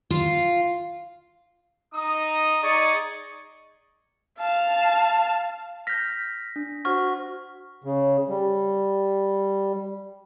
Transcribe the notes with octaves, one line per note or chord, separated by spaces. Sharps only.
F4
D#4 A#5 D#6
D#4 G#4 D5 D#5 C#6
F5 A5
F6 G6 A#6 B6
D4
F#4 C5 F#5 C#6 F6
C#3
G3